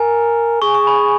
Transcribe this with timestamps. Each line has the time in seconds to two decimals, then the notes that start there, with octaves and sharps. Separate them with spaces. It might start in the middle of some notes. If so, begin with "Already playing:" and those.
Already playing: A#4 G#5
0.62 G#4 C#6
0.75 C#6
0.87 B5